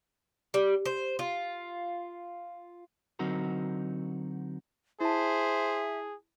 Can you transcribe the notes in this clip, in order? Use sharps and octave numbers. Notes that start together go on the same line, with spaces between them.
G3
C5
F4
D3 F#3 C4 D#4 F#4 A#4
E4 G#4 C5 E5 A5